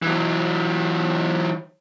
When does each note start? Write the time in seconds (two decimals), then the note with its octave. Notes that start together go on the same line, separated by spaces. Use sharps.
0.02 E3 F#3